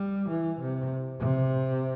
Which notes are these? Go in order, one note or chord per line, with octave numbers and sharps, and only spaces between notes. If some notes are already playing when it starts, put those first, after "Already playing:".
Already playing: G3
E3
C3
C3